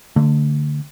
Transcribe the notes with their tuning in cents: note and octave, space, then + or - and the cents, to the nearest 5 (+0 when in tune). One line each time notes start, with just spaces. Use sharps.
D3 -10 A3 +25